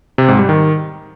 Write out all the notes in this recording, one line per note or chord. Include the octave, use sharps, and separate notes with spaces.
C3
G#2
G3
D#3